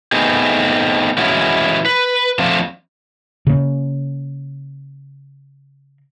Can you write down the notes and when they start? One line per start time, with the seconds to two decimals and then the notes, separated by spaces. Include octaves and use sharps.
0.12 A3 B3 C4 D#4 G#4
1.18 E3 G#3 C#4 E4 F#4
1.86 B4
2.39 F3 A3 C4 D4 F4
3.47 C#3 A#3